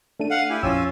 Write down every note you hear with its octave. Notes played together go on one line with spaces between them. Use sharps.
A3 D4 D#7
F5 F#5
E4 G4 G#5
A#1 F2 C#4 F4 G#5 E6